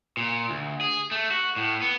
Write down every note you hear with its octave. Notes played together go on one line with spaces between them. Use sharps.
A#2
D2
G#4
A3
F#4
A2
B3